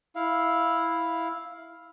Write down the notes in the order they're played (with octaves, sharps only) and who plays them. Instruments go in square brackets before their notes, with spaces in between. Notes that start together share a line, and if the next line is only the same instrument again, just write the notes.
[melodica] E4 F5